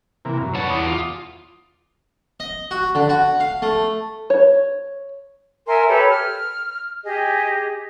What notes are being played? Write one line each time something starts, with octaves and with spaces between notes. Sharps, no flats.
C3 E3 A#3
F#2
G3 B4 C#5 F#5 A5
E2 D6 D#6
F4
D#5
F#4
D3
F#4
F5
A3
C#5
A#4 E5 G#5 C6
G4 A4 B4 C#5
F6
G4 G#4 D#5